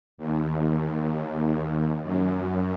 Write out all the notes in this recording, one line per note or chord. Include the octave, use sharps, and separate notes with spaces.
D#2
F#2